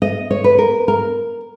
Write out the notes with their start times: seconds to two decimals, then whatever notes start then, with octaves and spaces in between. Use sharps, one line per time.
0.02 D#5
0.31 C#5
0.44 B4
0.58 A#4
0.88 A#4